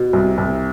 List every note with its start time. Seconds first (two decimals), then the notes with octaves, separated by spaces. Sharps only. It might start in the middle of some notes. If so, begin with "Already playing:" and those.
Already playing: B2
0.13 C2
0.38 C2